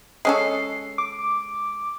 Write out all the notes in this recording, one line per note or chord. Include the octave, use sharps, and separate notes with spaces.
G#3 C#4 A4 C7
D6